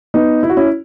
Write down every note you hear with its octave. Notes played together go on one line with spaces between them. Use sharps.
B3 D#4
E4
F#4
C#4 E4